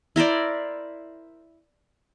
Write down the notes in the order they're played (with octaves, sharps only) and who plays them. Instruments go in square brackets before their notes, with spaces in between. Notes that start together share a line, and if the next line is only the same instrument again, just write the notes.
[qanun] E4 A#4 C5 D5